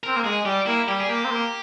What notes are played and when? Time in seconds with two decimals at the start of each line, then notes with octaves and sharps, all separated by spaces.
0.03 C4 A#4
0.16 A#3
0.25 G#3 G#4
0.45 G3 G4
0.66 A#3 E4
0.88 G3 G4
1.00 G#4
1.09 A#3 G4
1.24 C4
1.31 A#3